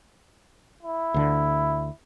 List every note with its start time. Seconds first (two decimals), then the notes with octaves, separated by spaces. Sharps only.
0.83 E4
1.14 D2 D3